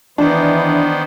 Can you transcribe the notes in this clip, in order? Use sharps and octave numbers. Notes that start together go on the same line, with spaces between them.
D#3 E3 B3 D4 C5